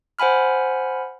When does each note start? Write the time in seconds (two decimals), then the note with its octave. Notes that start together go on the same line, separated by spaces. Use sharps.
0.19 C5 F#5 G#5 B5 F6